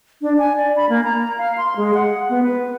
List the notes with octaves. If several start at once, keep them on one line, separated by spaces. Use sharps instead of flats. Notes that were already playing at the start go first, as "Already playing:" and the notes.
D4
G#5
D5
B5
A#3
A#5
F5
C6
G#3
F#5
B3
B4